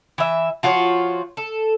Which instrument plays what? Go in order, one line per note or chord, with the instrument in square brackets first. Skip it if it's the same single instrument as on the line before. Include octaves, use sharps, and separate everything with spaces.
[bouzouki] E3 E5
F3 F4 F#4 C#5
A4